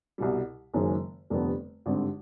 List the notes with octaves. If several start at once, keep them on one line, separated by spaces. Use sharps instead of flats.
C2 B2 G3
F#1 F#2 D#3 G#3 C#4
F1 F2 D3 G3 B3
G#1 G2 D3 G3 C4